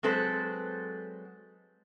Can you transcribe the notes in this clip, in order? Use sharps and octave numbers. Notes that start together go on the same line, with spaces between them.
F#3 G#3 C4 A4 B4 C5